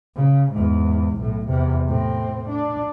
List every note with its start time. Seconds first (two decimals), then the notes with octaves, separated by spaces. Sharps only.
0.15 C#3
0.52 E2 G#2
1.17 B1 A2
1.47 E2 C3
1.88 A2 C4
2.49 D4